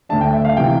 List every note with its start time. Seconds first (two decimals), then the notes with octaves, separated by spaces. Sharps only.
0.09 D2 D3 A3 D4 A5
0.21 G5
0.33 E5
0.45 F5
0.57 C3 E3 G5